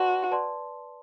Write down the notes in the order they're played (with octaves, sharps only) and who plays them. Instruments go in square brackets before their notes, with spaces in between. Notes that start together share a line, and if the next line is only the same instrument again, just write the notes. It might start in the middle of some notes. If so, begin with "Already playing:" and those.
Already playing: [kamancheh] F#4 [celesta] B4 D5 A5 C6
[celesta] B4 D5 A5 C6